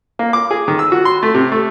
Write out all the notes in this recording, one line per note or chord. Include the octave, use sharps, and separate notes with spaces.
A#3
D6
G#4
D#3
E6
F#4
C6
A3
C3
A3